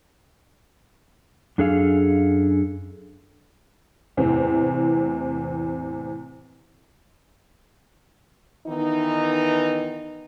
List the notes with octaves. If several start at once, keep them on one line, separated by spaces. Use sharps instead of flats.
F#2 D4 G#4 A4 F5
E2 A2 C3 E3 C4
D#3 E3 B3 D#4